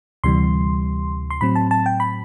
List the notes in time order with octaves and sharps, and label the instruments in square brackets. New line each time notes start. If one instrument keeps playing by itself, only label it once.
[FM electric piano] D2 C3 E3 G3 C6
C6
A2 F#3 C4 B5
A5
A5
G5
B5